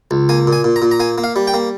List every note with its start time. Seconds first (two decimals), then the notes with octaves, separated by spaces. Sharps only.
0.11 C#2
0.29 A#3 G#5
0.47 A#2
0.53 G#5
0.64 A#2
0.76 A#5
0.82 A#2
0.91 A#5
1.00 A#3 G#5
1.18 A#3
1.24 F5
1.36 G3
1.47 G5
1.54 A#3